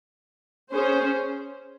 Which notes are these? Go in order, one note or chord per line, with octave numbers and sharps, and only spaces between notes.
C#4 G#4 C5